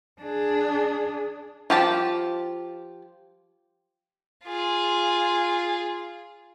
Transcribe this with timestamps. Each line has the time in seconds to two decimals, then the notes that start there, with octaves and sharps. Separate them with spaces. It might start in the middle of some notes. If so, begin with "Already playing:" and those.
0.22 D4 G#4
1.70 F3 G4 A5
4.45 F4 G#4